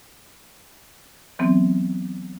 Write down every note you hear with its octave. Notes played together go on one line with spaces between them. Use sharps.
E3 F#3 B3 C4